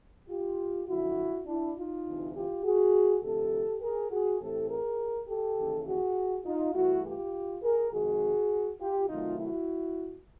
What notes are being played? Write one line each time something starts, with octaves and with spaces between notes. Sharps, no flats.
F4 G4
F#2 D3 F3 E4 F#4
D4 E4
D#4 F4
D2 C3 E3
F4 G4
F#4 G#4
D2 C3 F3 A3 G4 A4
G#4 A#4
F#4 G#4
A2 E3 A3 C4 G4 A4
G#4 A#4
G4 A4
D#2 C#3 E3
F#4 G#4
D#4 F4
G2 E3 A3 E4 F#4
F4 G4
G#4 A#4
F2 C3 D#3 G#3 F#4 G#4
F4 G4
C3 D#3 F#3 A3 D#4 F4
E4 F#4